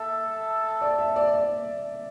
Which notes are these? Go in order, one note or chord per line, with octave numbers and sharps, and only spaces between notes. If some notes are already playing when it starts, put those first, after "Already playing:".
Already playing: A4 E5
D5
E5
D5
D5